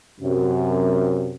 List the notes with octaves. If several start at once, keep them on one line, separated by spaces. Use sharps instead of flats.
F#2 C3